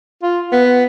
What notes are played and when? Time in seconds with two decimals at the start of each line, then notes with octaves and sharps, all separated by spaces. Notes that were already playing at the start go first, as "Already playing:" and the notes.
0.22 F4
0.52 B3